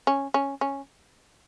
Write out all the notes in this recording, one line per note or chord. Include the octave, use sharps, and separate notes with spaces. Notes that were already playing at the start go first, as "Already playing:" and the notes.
C#4
C#4
C#4